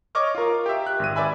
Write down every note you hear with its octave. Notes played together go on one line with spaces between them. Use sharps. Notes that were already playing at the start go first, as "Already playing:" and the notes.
C#5 D#5 C#6 D6 F6
F4 A#4
G4 E5
F#6
G#1 D#7
B4 D5 E5 G#5 B5